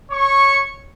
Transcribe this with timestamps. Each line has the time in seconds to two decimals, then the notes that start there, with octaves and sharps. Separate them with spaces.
0.10 C#5 C#6